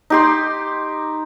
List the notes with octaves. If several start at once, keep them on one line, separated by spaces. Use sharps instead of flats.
D#4 G4 C6